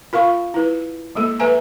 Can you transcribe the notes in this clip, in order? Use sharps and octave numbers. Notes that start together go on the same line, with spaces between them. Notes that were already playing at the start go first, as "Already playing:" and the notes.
F4 A#4 F5 C#6
E4 B4
G#3 A#3 A4
A4 B4 E5 G#5 A#5